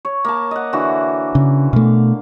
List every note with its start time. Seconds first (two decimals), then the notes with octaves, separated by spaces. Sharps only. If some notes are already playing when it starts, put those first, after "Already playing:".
0.05 C#5
0.25 A#3 A5
0.51 D#5 F#5
0.73 D3 E3 F#4
1.35 C#3
1.73 B2 A3 F5